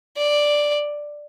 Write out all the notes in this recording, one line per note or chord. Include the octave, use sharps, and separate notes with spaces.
D5